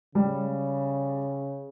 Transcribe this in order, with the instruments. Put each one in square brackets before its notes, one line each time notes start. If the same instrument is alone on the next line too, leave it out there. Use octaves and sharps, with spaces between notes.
[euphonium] C#3 [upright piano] G3